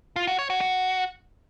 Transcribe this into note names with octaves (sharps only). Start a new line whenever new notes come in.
F4
F#4
C#5
F#4
F#4